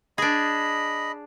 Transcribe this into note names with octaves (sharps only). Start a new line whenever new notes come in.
D4 G#4 D#5 B5